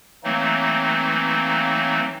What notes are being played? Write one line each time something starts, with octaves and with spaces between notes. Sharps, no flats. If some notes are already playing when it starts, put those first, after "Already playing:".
E3 F#3 A3 A#3 C4 D#4